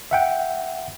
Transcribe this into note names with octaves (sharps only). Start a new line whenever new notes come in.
E5 F#5 G5